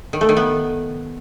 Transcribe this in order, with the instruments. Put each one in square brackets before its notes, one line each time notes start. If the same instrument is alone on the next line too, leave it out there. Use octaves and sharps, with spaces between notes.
[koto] D#3
A3
D#3
B3